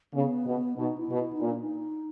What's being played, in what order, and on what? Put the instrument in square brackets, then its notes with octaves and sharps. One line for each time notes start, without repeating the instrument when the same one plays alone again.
[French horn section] C#3 [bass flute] B3
[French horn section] B2
[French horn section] B2 [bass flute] D#4
[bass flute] E4
[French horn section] B2
[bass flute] E4
D#4
[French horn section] A#2
[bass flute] D4
D#4